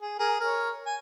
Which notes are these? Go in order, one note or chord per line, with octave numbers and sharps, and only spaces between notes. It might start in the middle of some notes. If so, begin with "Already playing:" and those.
G#4
G#4 A#4
A#4 C#5
G#5